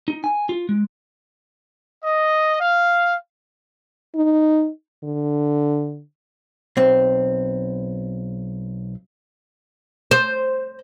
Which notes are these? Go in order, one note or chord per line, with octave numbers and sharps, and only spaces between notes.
D#4
G#5
F4
G#3
D#5
F5
D#4
D3
B1 C4
C5